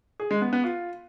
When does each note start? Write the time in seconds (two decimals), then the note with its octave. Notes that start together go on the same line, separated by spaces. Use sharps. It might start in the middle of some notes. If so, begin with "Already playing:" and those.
0.20 G#4
0.31 G#3
0.42 B3
0.53 B3
0.64 F4